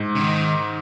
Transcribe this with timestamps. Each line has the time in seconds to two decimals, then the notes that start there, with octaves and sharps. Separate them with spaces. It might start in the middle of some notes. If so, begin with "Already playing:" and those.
Already playing: G#2
0.15 C#3
0.21 D#3